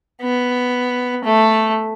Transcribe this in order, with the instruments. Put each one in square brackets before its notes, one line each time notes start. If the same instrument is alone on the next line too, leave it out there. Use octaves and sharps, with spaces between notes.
[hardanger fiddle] B3
A3